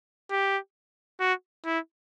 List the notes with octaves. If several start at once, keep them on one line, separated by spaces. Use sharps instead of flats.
G4
F#4
E4